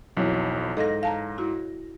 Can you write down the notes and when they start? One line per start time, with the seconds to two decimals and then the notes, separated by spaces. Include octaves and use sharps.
0.17 B1 F2 E3 F#3
0.77 G#2 A4 D#5 F5 A#6
1.03 F5 A5 A#5
1.38 E4 F#4